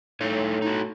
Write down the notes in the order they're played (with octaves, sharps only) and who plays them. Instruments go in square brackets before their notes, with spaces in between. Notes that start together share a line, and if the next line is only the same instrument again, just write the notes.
[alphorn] A2 [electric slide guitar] D#4 A4 C#5
[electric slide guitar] D#4 F#4